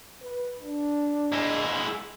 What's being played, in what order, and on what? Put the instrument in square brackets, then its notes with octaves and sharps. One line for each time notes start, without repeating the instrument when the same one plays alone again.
[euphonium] B4
D4
[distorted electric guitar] G#3 E4